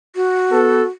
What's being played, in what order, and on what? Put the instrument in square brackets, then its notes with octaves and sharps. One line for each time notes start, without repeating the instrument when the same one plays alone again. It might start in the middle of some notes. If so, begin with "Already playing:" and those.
[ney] F#4
[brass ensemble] B3 A4